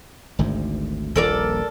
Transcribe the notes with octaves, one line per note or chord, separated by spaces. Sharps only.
G#1 D2 G#2
D#1 A#1 F3 A4 A#4 D5